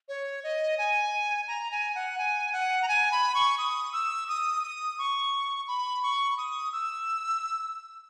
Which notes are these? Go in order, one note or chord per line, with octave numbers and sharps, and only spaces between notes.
C#5
D#5
G#5
A#5
G#5
F#5
G#5
F#5
A#5
G#5
B5
C#6
D#6
E6
D#6
D#6
C#6
B5
C#6
D#6
E6